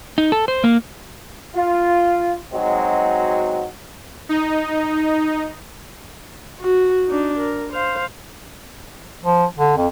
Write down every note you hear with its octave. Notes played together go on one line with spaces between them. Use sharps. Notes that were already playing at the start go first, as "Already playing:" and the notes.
D#4
A4
C5
A#3
F4
F#3 G#3 C4 D#4 F#4
D#4
F#4
D4 D#4
A#4
C5 F5
F3
D3
F2